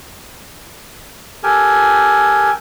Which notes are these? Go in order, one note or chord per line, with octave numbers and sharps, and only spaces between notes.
G4 A4 A#4 G#5